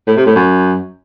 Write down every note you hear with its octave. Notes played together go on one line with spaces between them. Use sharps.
A2
C3
A2
F#2